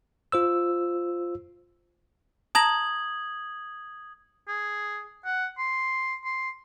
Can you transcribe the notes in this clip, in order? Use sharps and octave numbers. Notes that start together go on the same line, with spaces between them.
F4 C5 E6
A5 A#5 D#6 G#6 A#6 F#7
G#4
F#5
C6
C6